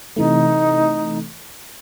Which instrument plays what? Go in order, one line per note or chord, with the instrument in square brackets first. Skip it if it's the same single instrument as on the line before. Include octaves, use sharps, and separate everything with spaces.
[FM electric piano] C3 E3 A3 [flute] D#4